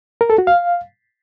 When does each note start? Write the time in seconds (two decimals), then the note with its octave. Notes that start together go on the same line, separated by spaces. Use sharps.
0.21 A#4
0.30 A4
0.38 F#4
0.47 F5